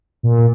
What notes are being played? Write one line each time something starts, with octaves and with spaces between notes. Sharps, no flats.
A#2